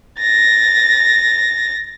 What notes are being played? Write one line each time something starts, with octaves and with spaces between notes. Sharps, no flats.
A6 A#6